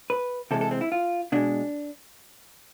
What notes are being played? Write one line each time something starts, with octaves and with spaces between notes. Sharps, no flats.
B4
C3 E3 G#3 A4
A4
C4
E4
F4
B2 G#3 D4